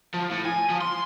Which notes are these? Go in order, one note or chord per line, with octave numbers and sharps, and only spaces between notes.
F3
A2
G#5
F3
C6